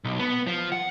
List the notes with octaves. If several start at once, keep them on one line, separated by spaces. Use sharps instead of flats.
B1
B3
F3
F#5